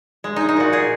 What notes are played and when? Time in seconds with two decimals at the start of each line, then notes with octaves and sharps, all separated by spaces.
0.24 G#3
0.36 G#3 D#4
0.49 D#4
0.56 A#2 F#4
0.73 A#2 G#4